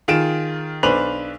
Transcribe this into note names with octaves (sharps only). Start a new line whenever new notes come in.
D#3 F4 G#4 D7 E7
B1 D4 B4 C5 F7 F#7